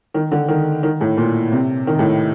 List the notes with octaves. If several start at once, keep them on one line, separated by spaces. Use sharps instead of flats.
D#3
D3
D#3
D#3
A2
A#2
C3
D#3
A2